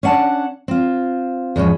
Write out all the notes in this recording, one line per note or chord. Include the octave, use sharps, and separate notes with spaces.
C#4 D4 F#5 A5
C4 F4
E2 G#2 F3 C#4